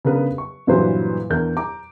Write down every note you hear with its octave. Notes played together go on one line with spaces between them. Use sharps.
C#3 B3 D4 A#4 B4
C#6
G2 A#2 E3 F#3 B4 C5
E2 D4 A#4 G6
A#5 D6